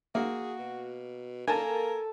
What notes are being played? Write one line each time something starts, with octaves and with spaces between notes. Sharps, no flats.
A#3 F#4 G#4
B2
A#3 A4 A#4 G#5 A5